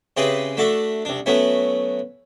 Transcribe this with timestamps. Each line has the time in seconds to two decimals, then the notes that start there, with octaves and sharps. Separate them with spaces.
0.17 C#3 C4 E4 G4 G#4 B4
0.57 A3 D4 F#4 A4 E5
1.05 C2 D4
1.26 F#3 A3 B3 C#4 E4